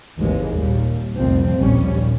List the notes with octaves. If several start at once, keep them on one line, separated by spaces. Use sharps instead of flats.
G#1 D#2 E3 G#3
D#2 A#2 G3
F1 C2 F2 F3 C4
A#1 D#2 G3 C#4